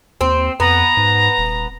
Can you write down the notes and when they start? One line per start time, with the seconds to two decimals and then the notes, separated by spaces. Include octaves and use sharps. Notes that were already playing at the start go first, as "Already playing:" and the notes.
0.21 D#2 C4
0.60 F2 B3 A#5
0.97 G#2
1.38 D#1